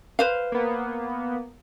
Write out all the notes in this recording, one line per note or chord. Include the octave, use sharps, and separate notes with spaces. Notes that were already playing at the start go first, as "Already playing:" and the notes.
B4 C5 F5
A#3 B3